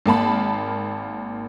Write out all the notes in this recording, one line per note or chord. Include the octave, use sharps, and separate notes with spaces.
G#1 A#3 A5 B5